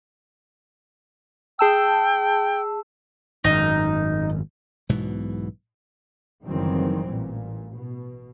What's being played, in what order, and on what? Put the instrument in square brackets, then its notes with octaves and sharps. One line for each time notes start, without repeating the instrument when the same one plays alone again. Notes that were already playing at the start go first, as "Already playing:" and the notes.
[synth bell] G#4 A5 E6 [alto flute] G5
[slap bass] G#1 F#2 [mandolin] D#4
[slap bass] B1 G#2 B2 E3
[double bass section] F#1 D#3 E3 F#3 G3 C4
A1 A#2
B2